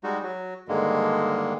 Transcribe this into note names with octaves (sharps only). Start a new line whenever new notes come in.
G3 G#3 D#4 F#4
F#3 F#4
G2 D3 D#3 G#3 A#3